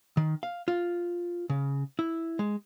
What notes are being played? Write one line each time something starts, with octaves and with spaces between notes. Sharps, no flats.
D#3
F5
F4
C#3
E4
G#3